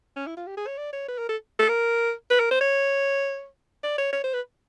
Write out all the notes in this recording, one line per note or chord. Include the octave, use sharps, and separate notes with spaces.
C#4
E4
F4
G4
G#4
C#5
D5
C#5
B4
A#4
A4
A4
A#4
B4
A#4
C5
C#5
D5
C#5
C#5
C5
B4